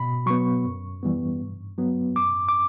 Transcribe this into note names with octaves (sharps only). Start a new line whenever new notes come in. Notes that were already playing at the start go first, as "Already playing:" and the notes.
Already playing: B2 B5
F#3 B3 C#6
F#2
E3 G3 B3
G2
F#3 B3
F#2 D6
D6